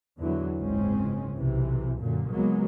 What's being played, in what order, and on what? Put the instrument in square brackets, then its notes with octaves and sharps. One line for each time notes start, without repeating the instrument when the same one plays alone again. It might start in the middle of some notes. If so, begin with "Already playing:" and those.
[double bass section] E2 D3 E3 F#3
F#1 C#2 G#2 G#3 C4 C#4
B1 C3 E3
F#2 A#2 D3
C#2 F#3 G#3 A#3 B3